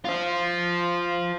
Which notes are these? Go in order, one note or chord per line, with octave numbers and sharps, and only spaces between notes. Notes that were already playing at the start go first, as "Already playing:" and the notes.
F4 C5